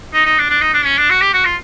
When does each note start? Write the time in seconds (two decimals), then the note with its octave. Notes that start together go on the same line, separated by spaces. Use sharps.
0.13 D#4
0.25 D#4
0.38 D4
0.50 D4
0.61 D#4
0.73 D4
0.85 C#4
0.97 D4
1.10 F#4
1.21 G4
1.33 F#4
1.45 F4